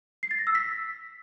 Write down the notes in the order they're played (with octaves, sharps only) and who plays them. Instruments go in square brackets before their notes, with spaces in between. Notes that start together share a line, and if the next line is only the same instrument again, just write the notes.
[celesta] C7
A6
A#6
E6
B6